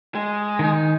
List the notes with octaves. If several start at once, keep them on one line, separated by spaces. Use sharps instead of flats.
G#3
D#3 D#4